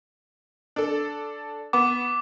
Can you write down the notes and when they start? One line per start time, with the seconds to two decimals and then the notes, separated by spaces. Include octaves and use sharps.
0.76 D4 A4
1.73 B3 D6